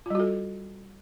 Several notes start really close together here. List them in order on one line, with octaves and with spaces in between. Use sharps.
F4 G3 F#4 A4